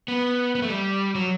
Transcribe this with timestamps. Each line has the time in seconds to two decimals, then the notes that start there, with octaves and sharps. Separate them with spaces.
0.08 B3
0.55 B3
0.62 A3
0.70 G3
1.15 F#3